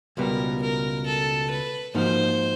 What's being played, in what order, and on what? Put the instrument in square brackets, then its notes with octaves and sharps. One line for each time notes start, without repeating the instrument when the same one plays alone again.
[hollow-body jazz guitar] C#2 B2 G3 B3 [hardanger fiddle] A#4
[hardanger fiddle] A#4
A4
B4
[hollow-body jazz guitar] G#2 F3 A#3 D#4 F#4 [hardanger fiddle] C5